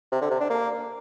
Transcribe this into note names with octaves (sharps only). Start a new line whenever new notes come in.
C3
D3
C3
D4
A#3